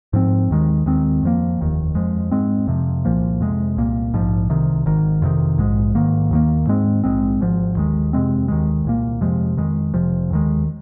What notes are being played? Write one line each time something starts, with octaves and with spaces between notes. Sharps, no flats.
G#2 F3 C4
D#2 D#3 G#3
D#2 D#3 G#3 C4
F2 F3 A#3
F1 D#2 D#3
F2 F3 G#3
G#2 G#3 C4
F2 C3 F3
C2 A#2 F3 A#3
F2 C3 G#3
C2 A#2 A#3
A#1 G#2 F3
C2 C3 D#3
G#1 G#2 D#3
F2 C3 D#3
A#1 G#2 G#3
G#2 D#3 A#3
D#2 D#3 A#3
G#2 G#3 C4
A#1 G#2 G#3 C4
G#1 G#2 F3
D#2 D#3 G#3
F2 C3 G#3 C4
D#2 D#3 G#3
C2 A#2 A#3
F2 C3 F3 G#3
F2 D#3 G#3
F1 F2 C3 F3
D#2 D#3 G#3